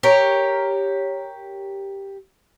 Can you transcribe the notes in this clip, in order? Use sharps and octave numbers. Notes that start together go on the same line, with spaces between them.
G4 A#4 C#5